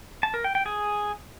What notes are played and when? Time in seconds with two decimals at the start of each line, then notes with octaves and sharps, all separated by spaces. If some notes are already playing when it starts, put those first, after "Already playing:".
0.23 A5
0.34 A#4
0.44 G5
0.55 G5
0.66 G#4